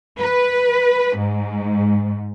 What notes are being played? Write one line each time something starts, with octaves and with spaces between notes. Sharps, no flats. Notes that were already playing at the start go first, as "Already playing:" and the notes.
B4
G#2